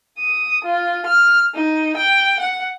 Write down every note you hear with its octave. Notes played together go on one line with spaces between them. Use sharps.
D#6
F4
F6
D#4
G5
F#5